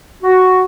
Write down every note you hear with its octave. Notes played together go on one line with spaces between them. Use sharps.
F#4